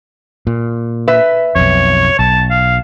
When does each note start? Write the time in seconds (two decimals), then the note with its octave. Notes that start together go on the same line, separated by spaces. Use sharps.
0.47 A#2
1.08 B4 E5
1.56 B1 F2 C#5
2.19 B1 A5
2.50 F5